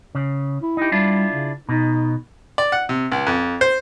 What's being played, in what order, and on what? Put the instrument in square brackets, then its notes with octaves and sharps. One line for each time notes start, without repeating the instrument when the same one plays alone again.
[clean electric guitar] C#3
[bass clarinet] E4
[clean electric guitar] D#4 G4
[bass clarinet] G3 [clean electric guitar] D4 E4 F4
[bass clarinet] C#3
[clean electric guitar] B2 [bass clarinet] D#4
[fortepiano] D5
F#5
C3
C#2
F2
C5